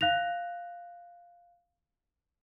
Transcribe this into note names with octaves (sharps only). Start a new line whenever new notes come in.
F5 F#6 A#6 F7